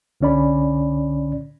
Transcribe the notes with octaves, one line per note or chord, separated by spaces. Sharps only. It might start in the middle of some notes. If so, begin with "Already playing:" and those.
C2 D3 C#4 D5 B5